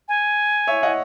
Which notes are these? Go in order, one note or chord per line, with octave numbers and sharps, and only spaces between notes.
G#5
C#5 E5
D#5 F#5